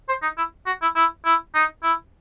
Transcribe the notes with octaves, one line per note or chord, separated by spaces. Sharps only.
C5
D#4
E4
F#4
E4
E4
E4
D#4
E4